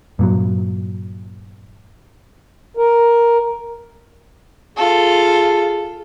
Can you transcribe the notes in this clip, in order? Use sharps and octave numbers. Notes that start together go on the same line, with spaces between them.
G2 A#2 F#3
A#4
F4 G#4 A4